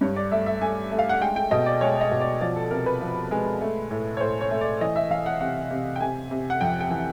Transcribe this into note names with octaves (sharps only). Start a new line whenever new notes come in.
G2 C#5
D5
A3 E5
E5
A3 G#5
A3
F5
F#5
G#3 G5
G5
B2 D#5
D5
G#3 C#5
D#5
B2
D5
F3 D5
A4
C3 A#4
B4
F3
G#3
A3
A2
C#5
A2 C5
C#5
A3
D5
E3 D#5
E5
E3 F5
F#5
C3 F#5
C3
G5
C3 G#5
C3
F#5
F2 G5
G5
E3